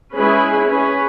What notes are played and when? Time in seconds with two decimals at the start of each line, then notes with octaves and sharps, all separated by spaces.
0.14 G#3 C#4 E4 G#4 B4
0.66 C#4 G#4 B4